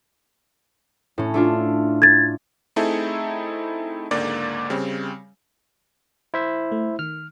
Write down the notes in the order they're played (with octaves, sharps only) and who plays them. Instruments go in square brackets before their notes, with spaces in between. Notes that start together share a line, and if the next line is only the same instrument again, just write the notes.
[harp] A2 C#4
A3 D4 F4
[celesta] G#6 A6
[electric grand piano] A3 C4 D#4 E4 G#4 A4
C#2 G#2 D3 A#3 D5
C#3 G3 C4
[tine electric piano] E4 C5 E5
[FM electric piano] A3
[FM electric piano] D#3 [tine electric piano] F6